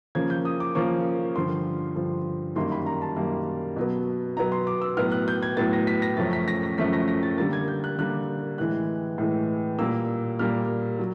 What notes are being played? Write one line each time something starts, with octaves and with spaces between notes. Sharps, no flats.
C#3 F3 A#3 C#4 G#6
G6
D#6
D6
C#3 F3 A#3 C#4 C#6
G2 D3 F3 C6
G2 D3 F3
F#2 D#3 G3 A#3 C6
B5
A#5
A5
F#2 D#3 G3 A#3
B2 F#3 B3
B2 F#3 B3 A#5
C6
D6
E6
A2 F#3 B3 F6
F#6
G6
G#6
A2 F#3 B3 A6
A#6
B6
A#6
F#2 C#3 F3 A3 C#4 A6
B6
A#6
A#6
F#2 C#3 F3 A3 C#4 B6
A#6
A#6
A6
D3 G3 A#3 A6
G#6
G6
F#6
D3 G3 A#3 F#6
A2 E3 G#3 F#6
A2 E3 G#3
A#2 G3 A#3 E6
A#2 G3 A#3 F6
F#3